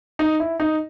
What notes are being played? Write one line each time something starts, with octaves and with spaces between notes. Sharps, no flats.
D#4
E4
D#4